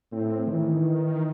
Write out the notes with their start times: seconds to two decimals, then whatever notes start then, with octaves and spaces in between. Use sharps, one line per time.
0.12 A2 C4
0.47 D#3 E3